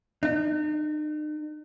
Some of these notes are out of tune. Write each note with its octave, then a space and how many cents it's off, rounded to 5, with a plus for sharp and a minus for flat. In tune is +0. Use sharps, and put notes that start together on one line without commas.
D#4 -45